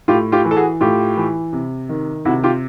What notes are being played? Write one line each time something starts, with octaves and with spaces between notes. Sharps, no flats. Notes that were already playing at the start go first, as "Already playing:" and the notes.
A2 F4 G4
F4 G4
E3
A4
F#4 G#4
A2 F4 G4
E3
C3
D#3
C3 E4 F#4
F4 G4